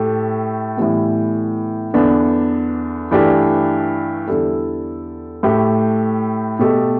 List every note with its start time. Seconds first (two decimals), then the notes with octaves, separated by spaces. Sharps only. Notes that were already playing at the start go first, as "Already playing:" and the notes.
Already playing: A2 A3 G4
0.77 A2 E3 G3 B3
1.94 E2 D3 B3 D4
3.11 G2 E3 A3 D4 G4
4.27 E2 D3 G3 E4 A4
5.43 A2 A3 G4
6.59 B2 A3 G4